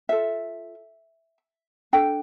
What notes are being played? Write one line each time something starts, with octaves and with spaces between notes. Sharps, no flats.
F4 A4 E5
D4 A4 G5